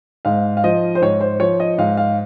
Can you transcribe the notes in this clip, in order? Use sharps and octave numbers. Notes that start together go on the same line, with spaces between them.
G#2 F5
F5
F3 D#5
C5
G#2 C#5
C5
F3 C#5
D#5
G#2 F5
F5